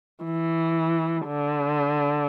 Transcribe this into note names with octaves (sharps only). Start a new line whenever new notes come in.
E3
D3